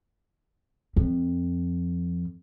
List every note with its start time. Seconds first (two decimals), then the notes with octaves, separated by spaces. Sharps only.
0.96 F2